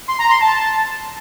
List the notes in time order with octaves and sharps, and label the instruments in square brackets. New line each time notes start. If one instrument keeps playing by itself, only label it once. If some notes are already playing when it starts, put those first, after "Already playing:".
[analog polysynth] C6
A#5
C6
A5